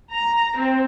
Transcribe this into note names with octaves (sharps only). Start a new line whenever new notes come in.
A#5
C4